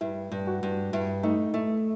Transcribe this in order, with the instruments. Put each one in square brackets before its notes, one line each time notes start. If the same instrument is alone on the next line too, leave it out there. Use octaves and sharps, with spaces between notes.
[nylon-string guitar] G2 [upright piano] E4
[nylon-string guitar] G2
[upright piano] F#4
[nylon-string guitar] G2
[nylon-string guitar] G2 [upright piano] E4
[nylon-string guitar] A3 [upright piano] D#4
[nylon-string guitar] A3 [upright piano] E4